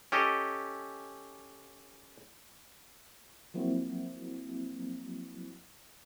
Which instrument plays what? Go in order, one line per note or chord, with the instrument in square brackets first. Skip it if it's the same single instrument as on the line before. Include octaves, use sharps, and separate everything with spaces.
[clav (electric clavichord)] C#4 G4 A4 D#5
[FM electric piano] F3 F#3 A#3 C4 E4 F#4